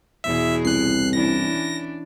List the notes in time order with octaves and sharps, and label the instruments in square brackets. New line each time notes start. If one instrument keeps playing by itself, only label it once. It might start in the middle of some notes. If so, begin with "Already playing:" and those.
[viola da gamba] E2 B2 G#4 [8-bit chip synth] E5
[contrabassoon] C2 [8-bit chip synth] F#6 C7
[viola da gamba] E3 C#4 D4 [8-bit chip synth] A#6